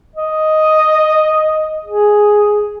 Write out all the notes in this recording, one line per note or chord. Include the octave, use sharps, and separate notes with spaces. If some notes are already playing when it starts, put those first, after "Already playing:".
D#5
G#4